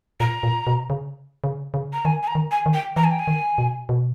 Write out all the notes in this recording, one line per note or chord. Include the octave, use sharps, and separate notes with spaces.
A#2 A#5
A#2
B2
C#3
C#3
C#3
A#5
D#3 G#5
G#5
A#5
D#3
G#5
D#3
G5
E3 A#5
G#5
G5
G#5
D#3
B2
B2